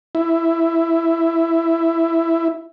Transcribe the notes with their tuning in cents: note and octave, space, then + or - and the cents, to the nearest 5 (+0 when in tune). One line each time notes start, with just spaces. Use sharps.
E4 +10